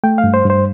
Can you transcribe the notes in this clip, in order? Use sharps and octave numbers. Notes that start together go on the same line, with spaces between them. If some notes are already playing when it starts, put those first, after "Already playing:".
A3 G5
F5
G2
C5
G2
C5